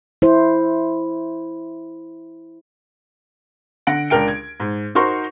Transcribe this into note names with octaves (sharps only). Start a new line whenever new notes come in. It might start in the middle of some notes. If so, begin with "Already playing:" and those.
E4 C5
D3 F#5 A#6 D7
C#2 D4 A#4 G5 D7
G#6
G#2
D#4 F#4 A#4 C5 C6 C#6